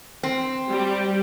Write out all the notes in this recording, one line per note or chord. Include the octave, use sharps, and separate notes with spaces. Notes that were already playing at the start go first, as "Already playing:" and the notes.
C4
G3